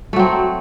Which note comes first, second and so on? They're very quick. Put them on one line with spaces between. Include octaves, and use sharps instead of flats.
A3 F#3 C4